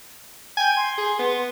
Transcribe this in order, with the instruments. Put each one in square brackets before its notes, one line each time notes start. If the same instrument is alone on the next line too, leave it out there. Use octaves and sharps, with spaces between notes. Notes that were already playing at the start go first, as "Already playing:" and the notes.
[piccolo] G5 [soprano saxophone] G#5
[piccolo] C6
[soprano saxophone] G#4
B3